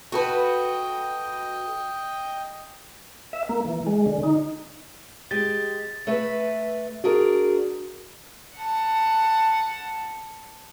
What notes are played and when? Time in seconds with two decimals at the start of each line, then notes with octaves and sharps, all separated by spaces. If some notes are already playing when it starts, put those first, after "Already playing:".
0.12 F#4 A4 B4 D#5 G5
3.33 E5
3.49 A#3
3.65 E3
3.87 G#3
4.06 D3
4.23 D#4
5.31 G#3 G4 A6
6.07 A3 B4 E5
7.04 D4 F#4 G#4 A#4
8.56 F#5 A5